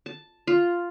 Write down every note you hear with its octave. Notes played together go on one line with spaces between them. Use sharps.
A5
F4